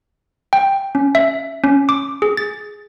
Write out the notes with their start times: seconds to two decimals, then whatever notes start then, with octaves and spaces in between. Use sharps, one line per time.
0.53 G5
0.95 C#4
1.15 E5
1.64 C#4
1.89 D6
2.22 G#4
2.37 A6